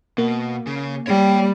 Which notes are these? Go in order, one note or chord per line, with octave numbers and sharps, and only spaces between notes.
B2 A#3
C#3
G3 C#5 G5